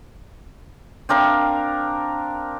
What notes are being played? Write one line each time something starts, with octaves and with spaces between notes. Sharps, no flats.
C4 D4 A#4 F5